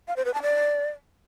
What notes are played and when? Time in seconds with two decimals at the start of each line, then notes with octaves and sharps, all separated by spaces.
0.08 F5
0.16 C5
0.25 B4
0.34 A5
0.42 D5